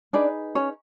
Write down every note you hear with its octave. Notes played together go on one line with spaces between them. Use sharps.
D4 D#4 G#4 B4 D5
C#4 C#5